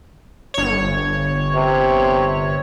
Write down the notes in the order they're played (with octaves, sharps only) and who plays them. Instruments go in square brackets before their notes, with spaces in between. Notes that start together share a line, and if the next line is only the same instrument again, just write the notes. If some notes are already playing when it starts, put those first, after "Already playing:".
[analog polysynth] G1 C#5
[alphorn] C3